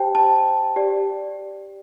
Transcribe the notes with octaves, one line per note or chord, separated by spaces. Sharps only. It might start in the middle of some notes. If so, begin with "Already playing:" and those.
Already playing: G4 C5 G5 A5
A5
G4 D5